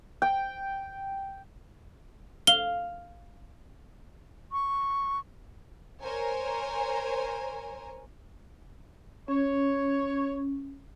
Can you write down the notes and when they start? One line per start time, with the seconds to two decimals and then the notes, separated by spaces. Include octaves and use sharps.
0.22 G5
2.47 F5 G7
4.52 C#6
6.01 A#4 C5 C#5 G#5
9.28 C#4 C#5